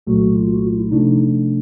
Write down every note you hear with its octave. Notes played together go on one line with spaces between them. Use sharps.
C2 A#2 F#3 A3 F#4
F4
F#4
F4
E4
C3 F3 A3 D4 D#4